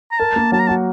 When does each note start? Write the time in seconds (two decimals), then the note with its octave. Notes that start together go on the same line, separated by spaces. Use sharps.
0.12 A#5
0.19 A#4 A5
0.36 A#3
0.52 F#3 A5
0.60 A#5
0.67 F#4 A5